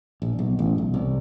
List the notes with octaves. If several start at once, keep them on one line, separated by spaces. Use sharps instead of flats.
A#1
B1
A1
B1
C2